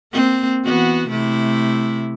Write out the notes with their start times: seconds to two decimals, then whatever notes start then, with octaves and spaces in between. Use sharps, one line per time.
0.13 A#3 C4
0.66 E3 B3 F#4
1.09 C3 A3 E4